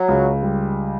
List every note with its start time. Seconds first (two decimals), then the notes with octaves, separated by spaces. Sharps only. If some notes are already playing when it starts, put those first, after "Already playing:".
Already playing: F#3
0.08 C#2
0.43 G3